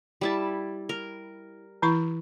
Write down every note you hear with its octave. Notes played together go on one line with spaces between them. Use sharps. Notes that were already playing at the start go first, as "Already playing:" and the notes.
G3 E4 A5
A#4
E3 E4 C#6